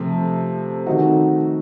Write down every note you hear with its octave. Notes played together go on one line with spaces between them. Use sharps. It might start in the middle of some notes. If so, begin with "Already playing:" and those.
Already playing: C3 F3 A3
D#3 A3 C4 D#4 F#4